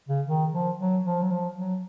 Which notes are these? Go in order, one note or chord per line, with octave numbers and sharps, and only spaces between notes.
C#3
D#3
F3
F#3
F3
F#3
F3
F#3